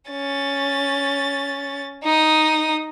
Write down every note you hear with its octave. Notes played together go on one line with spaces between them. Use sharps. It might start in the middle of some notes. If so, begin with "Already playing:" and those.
C#4 A6
D#4 D#6